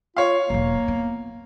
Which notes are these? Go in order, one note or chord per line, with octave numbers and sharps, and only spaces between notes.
F4 C#5 F5
E1 B1 A#3
B3